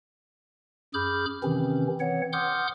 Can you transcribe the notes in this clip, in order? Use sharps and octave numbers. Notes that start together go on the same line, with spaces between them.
F#2 G#4 B5 D6 F6 G6
C3 D#3 E3 C4 C#4
E3 C4 C#5 F#5
F#5 C6 D6 D#6 F6 G6